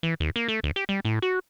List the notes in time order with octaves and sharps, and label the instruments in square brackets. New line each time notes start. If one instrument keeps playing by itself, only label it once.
[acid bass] E3
D#2
A#3
A3
D2
G4
G3
A2
F#4